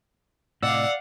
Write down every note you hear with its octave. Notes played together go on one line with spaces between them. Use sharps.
A2 C3 D5 D#5 F5 F#5 E6